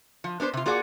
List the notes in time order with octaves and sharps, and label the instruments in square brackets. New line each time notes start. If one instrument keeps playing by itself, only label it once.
[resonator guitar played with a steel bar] F3
B3 D4 A4 C5
C3 F4
A#3 F4 F#4 G#4 D5 F#5